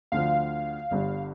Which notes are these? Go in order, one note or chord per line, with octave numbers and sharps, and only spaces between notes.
D2 D3 F3 F5
G1 G2 D3